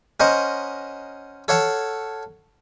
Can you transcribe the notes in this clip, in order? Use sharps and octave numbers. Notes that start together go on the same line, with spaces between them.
C#4 A#4 C5 D#5 F#5
A4 C#5 F5 F#5 A5